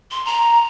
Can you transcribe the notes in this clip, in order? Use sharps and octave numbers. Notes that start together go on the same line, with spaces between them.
C6
A#5